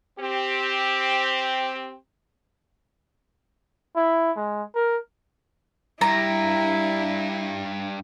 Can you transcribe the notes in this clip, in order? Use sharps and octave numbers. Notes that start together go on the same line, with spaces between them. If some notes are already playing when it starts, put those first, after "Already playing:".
C4 G4
E4
G#3
A#4
G2 E4 A#5